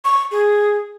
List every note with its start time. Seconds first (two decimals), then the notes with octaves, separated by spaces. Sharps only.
0.05 C#6
0.31 G#4